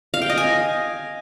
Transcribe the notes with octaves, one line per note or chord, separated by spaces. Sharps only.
F5
G5
D#5
G#5